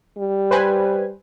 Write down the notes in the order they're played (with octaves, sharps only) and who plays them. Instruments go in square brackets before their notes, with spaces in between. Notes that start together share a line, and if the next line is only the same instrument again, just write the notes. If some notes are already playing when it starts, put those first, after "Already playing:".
[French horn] G3
[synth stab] B4 C5 G#5